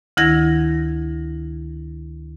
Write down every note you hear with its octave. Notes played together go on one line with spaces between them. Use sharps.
D2 D#3 E4 G#6 A#6